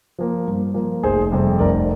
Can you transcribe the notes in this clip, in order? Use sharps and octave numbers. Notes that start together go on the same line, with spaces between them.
F3 A#3
G2
F3 A#3
F1 G#4 C5
F2 C3 G3
F1 A#4 D5